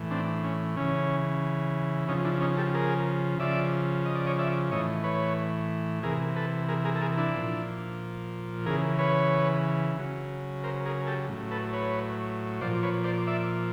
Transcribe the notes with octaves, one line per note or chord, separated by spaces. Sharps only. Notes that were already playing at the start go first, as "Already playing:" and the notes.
Already playing: A2 E3
C4 D4
C#4
C#3 E3 C#4
C#3 F3 C#4 D#4
D4 E4
C#4 D#4
G4 A4
G#4 A#4
C#3 F3 D5 E5
D#5
D5
C#5 D#5
D5 E5
A2 E3 C#5 D#5
B4 C#5
C3 E3 G#4 A#4
A4 B4
G#4 A#4
G#4 A#4
A4
G#4 A#4
D4 E4
A#2 F3
C#3 E3 G#4 A#4
B4 C#5
C#3 F#3
A#4 C5
G#4 A#4
G4 A4
A2 F#3
A4 B4
B4 C#5
A#2 F3 C5 D5
B4 C#5
C5 D5
D5 E5